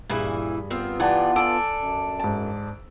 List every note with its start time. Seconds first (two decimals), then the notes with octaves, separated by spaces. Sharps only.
0.10 G2 A#2 E3 E4 G#4 B5
0.70 B3 C4 F4 A#4
1.00 E3 D4 E4 G4 F#5 A5
1.36 D4 A4 G#5 D6 E6 D7
1.79 F#2
2.20 G#2 A5